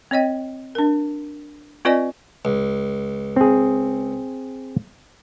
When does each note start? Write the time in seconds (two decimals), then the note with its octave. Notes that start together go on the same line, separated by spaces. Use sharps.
0.11 C4 C#5 D#5 G5
0.75 D4 A#4
1.85 C4 F4 B4 D5 D#5 G#5
2.45 C#2
3.36 C4 G#4